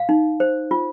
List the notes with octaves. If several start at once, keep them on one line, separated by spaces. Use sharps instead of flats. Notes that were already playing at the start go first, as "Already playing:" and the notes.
Already playing: F5
D#4
C5
F4